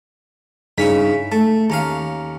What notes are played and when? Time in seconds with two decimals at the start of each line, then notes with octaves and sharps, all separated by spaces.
0.78 G2 C#3 C#4 D#4 E4 B6
1.32 A3 A5
1.70 D#2 C#4 F5 A#5